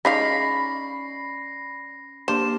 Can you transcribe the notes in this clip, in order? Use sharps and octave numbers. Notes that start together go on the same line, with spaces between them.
G#3 C#4 D#4 D5 F5 B5 A#6 C7
A#3 D4 G4 C5 E7